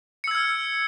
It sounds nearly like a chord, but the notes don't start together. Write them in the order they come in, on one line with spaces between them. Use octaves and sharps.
C#7 E6 G#6 F6